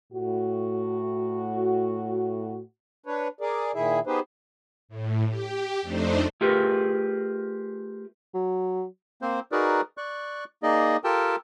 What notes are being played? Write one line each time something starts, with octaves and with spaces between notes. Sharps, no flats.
A2 F#4
D4 B4 C#5
G#4 A#4 D5
A#2 D#3 E4 G#4 E5
B3 D#4 G4 G#4 B4 C5
A2
G4
F2 A3 D4 D#4 C5
A3 F4 G4 G#4 A#4 B4
F#3
A#3 C4 C5
D#4 F#4 G#4 A#4 B4 D5
D5 C#6 F#6
A#3 D#4 G#4 D5 D#5
F4 G4 A4 A#4 G5 A5